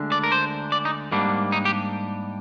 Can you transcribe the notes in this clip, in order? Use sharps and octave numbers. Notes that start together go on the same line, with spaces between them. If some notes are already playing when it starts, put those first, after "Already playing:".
Already playing: D2 D3 G#3 D4
D5
A#4
C5
D5
D#4
G#2 G3 A#3 D4
D#4
G4